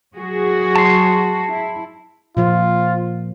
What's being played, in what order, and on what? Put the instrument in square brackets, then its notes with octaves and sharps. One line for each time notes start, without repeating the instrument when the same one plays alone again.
[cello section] F#3 F#4 G#4
[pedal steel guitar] A5 C6
[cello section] E4
[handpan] A#2 F3 [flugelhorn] F4